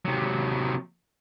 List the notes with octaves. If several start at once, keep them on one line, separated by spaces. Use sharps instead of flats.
C3 F#3